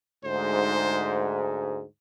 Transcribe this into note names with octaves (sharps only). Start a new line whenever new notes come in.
D2 G#2 C5